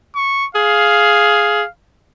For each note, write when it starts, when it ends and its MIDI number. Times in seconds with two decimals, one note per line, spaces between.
0.15 0.47 85
0.55 1.63 68
0.55 1.69 77